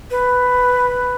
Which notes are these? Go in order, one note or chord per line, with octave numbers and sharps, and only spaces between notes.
B4